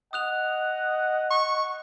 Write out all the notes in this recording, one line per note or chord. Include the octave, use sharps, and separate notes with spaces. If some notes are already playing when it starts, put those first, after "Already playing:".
D#5 F#5 D#6 F#6 F7
C#6